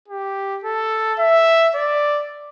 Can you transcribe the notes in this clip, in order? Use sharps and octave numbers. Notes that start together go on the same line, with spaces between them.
G4
A4
E5
D5